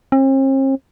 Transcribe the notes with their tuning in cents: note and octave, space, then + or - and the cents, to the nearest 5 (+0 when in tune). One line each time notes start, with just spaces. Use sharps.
C4 +45